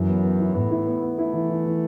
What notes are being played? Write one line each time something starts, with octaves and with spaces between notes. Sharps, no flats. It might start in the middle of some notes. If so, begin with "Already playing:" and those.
Already playing: F#2 E3
B3
B3
E4
A2 B3
E4
B3
B3
A3 E4
E3
E3
E3